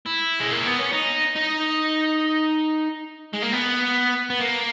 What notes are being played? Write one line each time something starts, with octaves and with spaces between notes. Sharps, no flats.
E4
G#3
A#3
B3
C#4
D#4
D#4
G#3
A#3
B3
B3
A#3